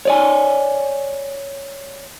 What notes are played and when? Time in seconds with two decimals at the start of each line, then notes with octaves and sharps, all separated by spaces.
0.05 C#5 D5 G#5